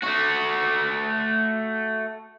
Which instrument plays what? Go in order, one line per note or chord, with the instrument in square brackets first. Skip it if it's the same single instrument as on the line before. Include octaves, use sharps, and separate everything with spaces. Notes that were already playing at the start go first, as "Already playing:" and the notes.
[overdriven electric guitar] A3 F#4